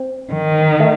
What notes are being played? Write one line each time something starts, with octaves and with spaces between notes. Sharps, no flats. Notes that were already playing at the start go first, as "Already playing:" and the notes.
Already playing: C4
D#3
A3